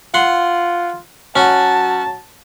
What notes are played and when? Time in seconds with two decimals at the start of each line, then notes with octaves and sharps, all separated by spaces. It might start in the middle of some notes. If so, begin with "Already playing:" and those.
0.14 F4 F#5 C6
1.36 F#3 C#4 F#4 A5